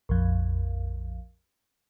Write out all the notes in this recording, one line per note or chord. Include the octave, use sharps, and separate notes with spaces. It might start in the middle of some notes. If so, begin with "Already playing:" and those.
A#1 F2